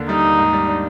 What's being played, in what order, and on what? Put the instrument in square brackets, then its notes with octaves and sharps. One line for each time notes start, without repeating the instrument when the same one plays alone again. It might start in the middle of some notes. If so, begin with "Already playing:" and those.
Already playing: [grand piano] D#2 D3
[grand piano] G3 [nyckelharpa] D#4
[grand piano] D#2
G#2
G3
D4